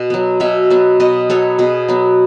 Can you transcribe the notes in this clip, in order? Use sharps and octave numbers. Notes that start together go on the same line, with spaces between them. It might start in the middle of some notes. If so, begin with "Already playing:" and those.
Already playing: B2
F#3 B3
B2 C#5 E5
F#3 B3
B2 B4 D#5
F#3 B3 A4 C#5
B2 G#4 B4
F#3 B3